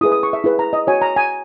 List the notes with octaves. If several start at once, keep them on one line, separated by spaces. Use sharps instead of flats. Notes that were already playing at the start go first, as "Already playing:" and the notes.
E4 G#4 B4 D#6
D#6
C#6
E5
E4 G#4 B4
A#5
D#5
F#4 C#5 G#5
A#5
G#5